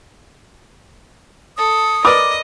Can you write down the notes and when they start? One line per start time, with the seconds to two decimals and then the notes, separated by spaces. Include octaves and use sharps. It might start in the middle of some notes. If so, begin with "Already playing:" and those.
1.57 A4 D#6
2.05 A#4 B4 D5 D#5 D6